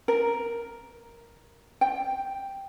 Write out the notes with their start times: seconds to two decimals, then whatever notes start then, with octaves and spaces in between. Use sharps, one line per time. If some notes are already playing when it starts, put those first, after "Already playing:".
0.08 A#4
1.81 G5